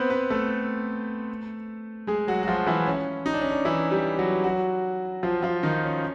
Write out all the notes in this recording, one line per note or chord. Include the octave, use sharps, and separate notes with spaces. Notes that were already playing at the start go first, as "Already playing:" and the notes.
Already playing: B3 C4 B4 C5
B3 B4
A3 A4
G#3 G#4
F#3 F#4
F#4
F3 F4
E3 E4
C#4
D#4
D4
C#4
D4
E3 E4
G3 G4
F#3 F#4
F#3 F#4
F3 F4
F3 F4
D#3 D#4
C#4
C#4